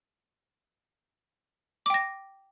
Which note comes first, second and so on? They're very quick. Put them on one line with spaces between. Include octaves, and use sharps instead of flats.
D6 G5 A#6